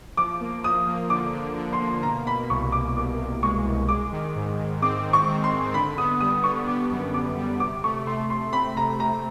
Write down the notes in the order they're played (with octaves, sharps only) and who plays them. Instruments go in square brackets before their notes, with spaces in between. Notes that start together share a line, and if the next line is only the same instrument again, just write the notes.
[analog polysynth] F3 [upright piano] D6
[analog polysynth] A#3
[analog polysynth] F3 [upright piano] D#6
[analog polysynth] A#3
[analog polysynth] D3 [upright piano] D6
[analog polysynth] D3
D3
[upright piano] C6
[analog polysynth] A#3
[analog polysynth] B2 [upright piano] A#5
[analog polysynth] B2 [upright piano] B5
[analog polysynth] C2 [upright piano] C#6
[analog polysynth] C2 [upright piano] D6
[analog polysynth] C2 [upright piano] D6
[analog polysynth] C2
[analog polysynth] G#3 [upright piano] C#6
[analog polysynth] C2
[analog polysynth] G#3 [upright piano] D6
[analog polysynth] D#3
G#2
D#3
[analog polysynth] C4 [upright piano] D6
[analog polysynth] G#2
[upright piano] C#6
[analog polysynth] D#3
[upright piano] C6
[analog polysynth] G#2
[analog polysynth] D3 [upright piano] B5
[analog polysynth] B3 [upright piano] D#6
[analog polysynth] G3 [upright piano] D#6
[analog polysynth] D3 [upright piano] C#6
[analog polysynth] B3 [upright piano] D6
[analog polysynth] F#2
[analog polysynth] F#2 [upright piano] D6
[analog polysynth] G3
[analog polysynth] C3 [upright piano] D6
[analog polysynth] A3 [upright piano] C#6
[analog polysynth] A3 [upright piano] C6
[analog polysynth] C3 [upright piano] C6
[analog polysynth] C4 [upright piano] B5
[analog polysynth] C3 [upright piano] A#5
[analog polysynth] C3 [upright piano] A#5